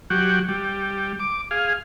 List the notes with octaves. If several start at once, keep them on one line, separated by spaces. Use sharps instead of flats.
F#3 F#4 G4
G3
D6
G#4 F5